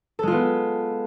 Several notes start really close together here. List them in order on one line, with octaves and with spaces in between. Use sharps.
A4 G#3 F4 B3